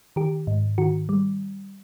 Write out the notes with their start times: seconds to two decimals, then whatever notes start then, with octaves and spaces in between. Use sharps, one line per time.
0.16 D#3 G4
0.47 G#2
0.78 D#3 F#4
1.09 G3